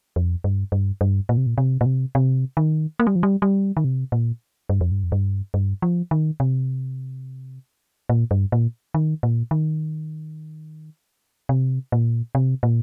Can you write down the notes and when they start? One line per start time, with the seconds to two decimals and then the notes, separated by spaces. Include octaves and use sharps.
0.16 F2
0.44 G2
0.72 G2
1.01 G2
1.29 A#2
1.37 C3
1.47 A#2
1.58 C3
1.81 A#2
1.86 C3
2.15 C3
2.57 D#3
3.00 A#3
3.07 G3
3.16 F3
3.23 G3
3.42 G3
3.77 D#3
3.84 C3
4.12 A#2
4.69 G2
4.81 F2
4.91 G2
5.04 F2
5.12 G2
5.54 G2
5.82 F3
6.11 D#3
6.40 C3
8.09 A#2
8.31 G2
8.52 A#2
8.94 D#3
9.23 A#2
9.51 D#3
11.49 C3
11.92 A#2
12.35 C3
12.63 A#2